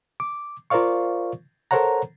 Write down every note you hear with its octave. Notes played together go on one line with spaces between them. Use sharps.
D6
F4 A#4 C5 D5 F5 C#6
A4 A#4 C5 C#5 F#5 A#5